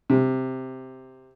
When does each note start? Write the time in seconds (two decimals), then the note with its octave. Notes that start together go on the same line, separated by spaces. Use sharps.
0.10 C3